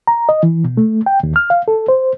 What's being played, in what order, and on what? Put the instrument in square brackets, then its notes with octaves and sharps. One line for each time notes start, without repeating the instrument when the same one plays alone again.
[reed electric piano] A#5
D#5
E3
B2
A3
G5
D#2
F6
F5
A4
C5